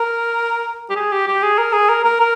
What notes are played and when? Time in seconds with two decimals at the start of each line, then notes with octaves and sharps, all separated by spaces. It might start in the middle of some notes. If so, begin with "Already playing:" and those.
Already playing: A#4
0.90 G4
0.96 G#4
1.12 G4
1.27 G4
1.43 G#4
1.58 A#4
1.73 G#4
1.89 A#4
2.04 A#4
2.20 A#4